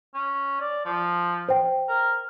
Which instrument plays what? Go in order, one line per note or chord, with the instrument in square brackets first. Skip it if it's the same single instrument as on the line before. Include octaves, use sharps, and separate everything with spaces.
[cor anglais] C#4
D5
F3
[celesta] C5 G5
[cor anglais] A#4